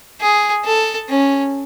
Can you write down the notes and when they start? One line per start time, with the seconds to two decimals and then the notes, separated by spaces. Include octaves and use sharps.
0.21 G#4
0.65 A4
1.09 C#4